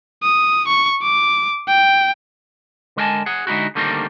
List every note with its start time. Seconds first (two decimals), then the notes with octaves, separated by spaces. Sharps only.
0.23 D#6
0.68 C#6
1.03 D6
1.68 G5
2.97 D3 G#3 A#4 D#5 G#5 A5
3.26 G#4 F#5
3.47 D3 G#3 C#4 D#4 E4 F#4
3.75 D3 D#3 G3 A3 A#3 C4